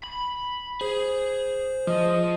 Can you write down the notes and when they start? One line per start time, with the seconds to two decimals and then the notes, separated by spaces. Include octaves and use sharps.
0.04 B5
0.81 G#4 C5
1.87 F3 D#5